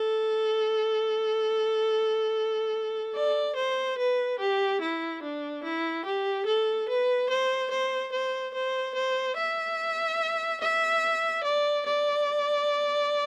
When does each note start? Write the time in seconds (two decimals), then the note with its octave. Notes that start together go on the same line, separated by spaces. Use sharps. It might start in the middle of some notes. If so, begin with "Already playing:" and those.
Already playing: A4
3.15 D5
3.56 C5
3.98 B4
4.40 G4
4.81 E4
5.23 D4
5.64 E4
6.06 G4
6.46 A4
6.89 B4
7.30 C5
7.71 C5
8.13 C5
8.54 C5
8.95 C5
9.37 E5
10.61 E5
11.44 D5
11.86 D5